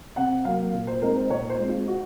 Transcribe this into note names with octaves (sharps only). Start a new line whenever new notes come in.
C3 F#5
F#3 A#3 F5
A#2
C5
G#3 C4 D#4 A#4
C5
A#2 C#5
C5
G#3 C4 D#4
F4
F#4